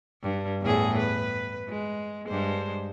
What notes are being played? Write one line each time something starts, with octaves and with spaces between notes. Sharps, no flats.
G2
E2 A2 G#4
B4
G#3
G2 G#3 C5